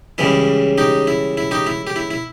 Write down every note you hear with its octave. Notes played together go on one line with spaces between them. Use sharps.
C#2 C#3 E3 G3 E4
D#4 G4
E4
E4
D#4 G4
E4
G4
E4
E4